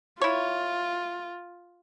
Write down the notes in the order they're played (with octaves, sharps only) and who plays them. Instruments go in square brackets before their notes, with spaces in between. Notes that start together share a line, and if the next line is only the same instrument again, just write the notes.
[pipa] E4 C#5 [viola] F4